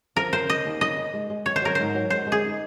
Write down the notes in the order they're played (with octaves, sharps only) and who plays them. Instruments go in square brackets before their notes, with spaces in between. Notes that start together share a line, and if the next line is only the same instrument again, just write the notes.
[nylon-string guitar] F3 [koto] A#4
[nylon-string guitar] C#3 [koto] C5
[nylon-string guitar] C#3 [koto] D#5
[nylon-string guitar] D#2
[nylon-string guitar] C#3 [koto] D#5
[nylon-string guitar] D#4
G#3
G#3
[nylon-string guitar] F#3 [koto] C#5
[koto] C5
[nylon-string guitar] F#3 [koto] A#4
[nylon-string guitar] G#2 [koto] C5
[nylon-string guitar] F#3
[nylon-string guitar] G#3 [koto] C5
[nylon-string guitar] G#3
[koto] G#4
[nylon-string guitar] D#4